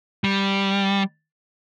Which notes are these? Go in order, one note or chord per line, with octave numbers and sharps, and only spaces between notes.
G3